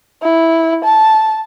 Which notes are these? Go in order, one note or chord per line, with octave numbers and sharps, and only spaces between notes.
E4
A5